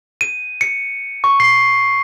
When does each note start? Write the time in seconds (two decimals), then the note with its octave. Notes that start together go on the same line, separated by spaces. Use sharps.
0.21 D#7
0.61 C#7
1.24 C#6
1.40 C7